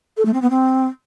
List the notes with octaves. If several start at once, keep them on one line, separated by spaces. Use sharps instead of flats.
A4
A3
C4
B3
C4